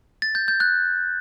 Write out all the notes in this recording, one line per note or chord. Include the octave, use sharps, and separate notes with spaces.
A6
G6
G6
F#6